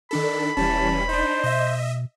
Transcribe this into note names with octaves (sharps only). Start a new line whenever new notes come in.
D#3 D4 A4 B5
E1 E3 G3 C#4 A5
D4 D#4 C5
B2 D#5 E5